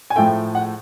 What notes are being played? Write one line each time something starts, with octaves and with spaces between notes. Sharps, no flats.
G#5
A2 F3 A3 G5
F#5